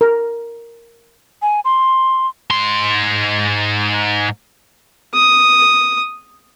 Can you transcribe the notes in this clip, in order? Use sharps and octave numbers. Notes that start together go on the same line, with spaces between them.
A#4
G#5
C6
G#2 C6
D#6